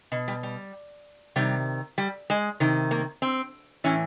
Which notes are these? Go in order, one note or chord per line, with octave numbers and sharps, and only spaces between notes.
B2
G3
G3
C3 D#3 G3
G3
G#3
C3 D#3
A#3
C4
A2 E3 C#4